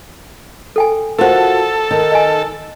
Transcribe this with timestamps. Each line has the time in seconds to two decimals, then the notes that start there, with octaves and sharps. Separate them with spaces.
0.76 A4 G5 G#5
1.19 F4 F#4 A4 A#4 C5
1.91 D#3
2.12 D#5 G#5